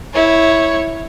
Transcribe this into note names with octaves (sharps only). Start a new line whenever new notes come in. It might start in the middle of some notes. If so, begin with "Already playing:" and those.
E4 C#5